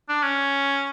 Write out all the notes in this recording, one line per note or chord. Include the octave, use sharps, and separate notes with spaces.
D4
C#4